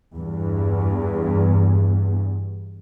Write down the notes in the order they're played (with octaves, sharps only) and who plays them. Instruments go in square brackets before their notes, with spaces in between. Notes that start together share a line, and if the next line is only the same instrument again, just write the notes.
[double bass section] E2 G2